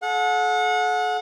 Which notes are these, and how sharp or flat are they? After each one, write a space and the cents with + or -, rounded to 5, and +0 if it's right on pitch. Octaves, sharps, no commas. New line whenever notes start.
A4 -40 F#5 -30